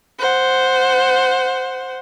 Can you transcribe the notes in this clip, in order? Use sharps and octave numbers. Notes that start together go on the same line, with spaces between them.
C5 F#5